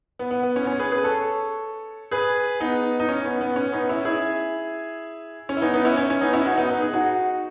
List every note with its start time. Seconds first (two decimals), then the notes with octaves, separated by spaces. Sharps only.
0.19 B3
0.31 B3
0.43 B3
0.56 C#4
0.63 B3
0.67 C#4
0.79 G#4 B4
0.91 G#4 B4
1.04 A4 C#5
2.11 G#4 B4
2.60 B3 D#4
3.00 D#4
3.09 C#4
3.25 B3
3.41 B3
3.56 C#4
3.72 B3 D#4
3.89 C#4 E4
4.05 E4 G#4
5.49 C#4
5.57 E4
5.62 B3 D#4
5.74 B3 D#4
5.85 C#4 E4
5.98 C#4
6.10 C#4
6.21 B3 D#4
6.33 C#4 E4
6.45 D#4 F#4
6.58 B3 D#4
6.70 B3 D#4
6.82 G#4
6.93 D#4 F#4